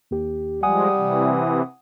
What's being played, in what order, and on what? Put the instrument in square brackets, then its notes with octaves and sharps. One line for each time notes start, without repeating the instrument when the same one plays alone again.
[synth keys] D#2 G4
[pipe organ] F3 G#3 [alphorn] G3 [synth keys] F#5 G#5 D#6
[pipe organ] C3 E3